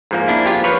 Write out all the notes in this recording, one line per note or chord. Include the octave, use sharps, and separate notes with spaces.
G#2 F3 A#3
D4 E4
F4 G4
F3 B4 C#5